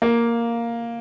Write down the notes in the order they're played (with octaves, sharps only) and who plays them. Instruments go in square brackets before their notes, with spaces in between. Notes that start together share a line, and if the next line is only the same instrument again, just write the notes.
[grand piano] A#3